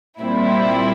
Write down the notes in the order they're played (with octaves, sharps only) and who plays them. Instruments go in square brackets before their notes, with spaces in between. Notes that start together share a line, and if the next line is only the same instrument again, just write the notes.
[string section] A#2 G3 C4 E4